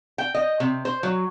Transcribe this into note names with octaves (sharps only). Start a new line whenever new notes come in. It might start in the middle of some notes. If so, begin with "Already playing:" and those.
G5
D#5
C3
C5
F#3